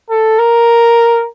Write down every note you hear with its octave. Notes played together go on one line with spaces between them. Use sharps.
A4
A#4